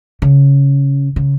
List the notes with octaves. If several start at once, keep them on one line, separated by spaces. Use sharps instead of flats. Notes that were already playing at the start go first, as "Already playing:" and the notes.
C#3
C#3